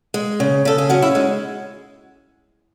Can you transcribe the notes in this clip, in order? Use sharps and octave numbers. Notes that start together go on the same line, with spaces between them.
G#3
C#3
C#3 A4
G#4
F#3 C#4 F#4
E4
G#3 D#4